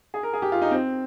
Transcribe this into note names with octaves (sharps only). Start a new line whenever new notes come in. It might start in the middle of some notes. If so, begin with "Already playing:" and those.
G#4
A#4
G#4
G4
F4
D#4
C4